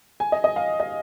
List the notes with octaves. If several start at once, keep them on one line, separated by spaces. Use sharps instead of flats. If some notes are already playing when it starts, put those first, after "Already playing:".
G#5
D#5
D#5
F5
D#5